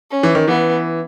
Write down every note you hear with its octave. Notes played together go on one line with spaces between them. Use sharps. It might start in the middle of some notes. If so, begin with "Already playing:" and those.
C#4
E3
D#3
E3 B3